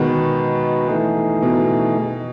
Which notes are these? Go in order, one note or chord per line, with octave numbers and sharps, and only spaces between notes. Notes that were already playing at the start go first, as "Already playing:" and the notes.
Already playing: B2 D#3 G#3 D#4 F#4 B4
E3 A3 D#4 G#4
B2